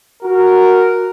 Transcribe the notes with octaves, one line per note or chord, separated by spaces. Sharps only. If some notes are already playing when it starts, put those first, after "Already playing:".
F#4 A#4